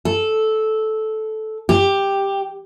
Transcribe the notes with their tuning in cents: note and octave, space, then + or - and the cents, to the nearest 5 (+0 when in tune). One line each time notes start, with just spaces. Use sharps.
A4 -10
G4 +5